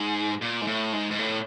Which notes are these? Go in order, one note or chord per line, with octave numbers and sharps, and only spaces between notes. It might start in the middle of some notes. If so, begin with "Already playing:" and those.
Already playing: G#2
A#2
G#2
A2
G#2
G#2
A2